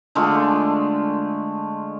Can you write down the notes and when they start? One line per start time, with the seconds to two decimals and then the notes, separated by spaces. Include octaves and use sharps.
0.15 D3 G#3 A3 F4